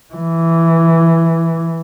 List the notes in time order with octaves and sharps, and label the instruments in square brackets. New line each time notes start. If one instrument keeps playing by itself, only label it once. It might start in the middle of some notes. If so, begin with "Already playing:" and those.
[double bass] E3